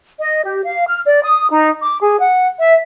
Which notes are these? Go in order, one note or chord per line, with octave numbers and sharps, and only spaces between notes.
D#5
G4
F5
F6
D5
D#6
D#4
D6
G#4
F#5
E5